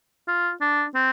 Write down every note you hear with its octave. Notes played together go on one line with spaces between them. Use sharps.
F4
D4
C4